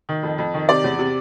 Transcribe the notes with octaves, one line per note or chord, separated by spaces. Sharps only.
D#3
F2
F2
D#3
C3 D5
E2
C3